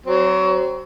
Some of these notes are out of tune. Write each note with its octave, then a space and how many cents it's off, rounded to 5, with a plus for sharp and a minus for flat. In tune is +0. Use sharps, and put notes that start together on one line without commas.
F#3 +30 C4 +0